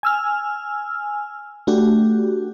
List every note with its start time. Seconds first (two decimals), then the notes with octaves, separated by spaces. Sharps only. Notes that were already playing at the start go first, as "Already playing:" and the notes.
0.03 G#5 E6 F6
1.67 A3 D4 F#4 G4